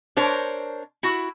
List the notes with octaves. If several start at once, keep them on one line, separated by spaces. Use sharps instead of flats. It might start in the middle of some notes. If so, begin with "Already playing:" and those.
D4 A#4 C5 C#5
E4 F#4